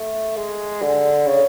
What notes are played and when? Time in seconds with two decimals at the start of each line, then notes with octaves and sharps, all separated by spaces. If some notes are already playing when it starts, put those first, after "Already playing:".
Already playing: A3
0.37 G#3
0.82 D3
1.27 C#3